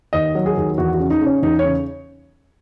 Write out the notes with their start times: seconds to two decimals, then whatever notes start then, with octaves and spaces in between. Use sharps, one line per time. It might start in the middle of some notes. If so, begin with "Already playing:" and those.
0.13 D#2 D#5
0.35 F#3
0.46 G#4
0.57 D#2
0.78 E2 F#4
0.94 F#4
1.00 C#3
1.10 D#4
1.21 C#3 C#4
1.43 E2 D#4
1.59 C#5
1.65 C#3